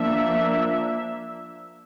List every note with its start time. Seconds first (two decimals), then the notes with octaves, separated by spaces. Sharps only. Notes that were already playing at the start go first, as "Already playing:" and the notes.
Already playing: F3 A#3 D4 E5